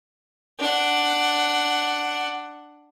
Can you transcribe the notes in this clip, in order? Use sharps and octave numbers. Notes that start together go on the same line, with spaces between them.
D4 F#5